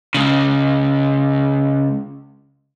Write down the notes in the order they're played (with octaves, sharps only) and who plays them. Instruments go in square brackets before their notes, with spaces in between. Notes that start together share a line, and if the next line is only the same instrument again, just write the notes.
[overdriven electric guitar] C#2 C#3